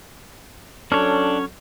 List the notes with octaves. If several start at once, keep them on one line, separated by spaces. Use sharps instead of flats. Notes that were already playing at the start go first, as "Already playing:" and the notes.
F#3 C#4 D4 A4 C#5